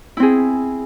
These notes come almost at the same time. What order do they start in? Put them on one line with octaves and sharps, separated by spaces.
E4 C4 G#4